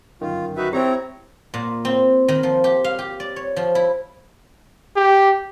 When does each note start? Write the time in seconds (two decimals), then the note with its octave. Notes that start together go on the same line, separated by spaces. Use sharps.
0.21 G1 F#2 D#3 F4
0.57 D#4 F#4 B4 E5
0.73 C4 E4 G4 C5 C#5 A#5
1.54 A#2
1.85 C4
2.28 D#3
2.43 F3
2.64 G4
2.84 F5
2.99 G4
3.20 D5
3.36 C#5
3.56 F3
3.75 E4
4.96 G4